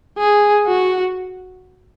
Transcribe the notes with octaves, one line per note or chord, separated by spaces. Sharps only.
G#4
F#4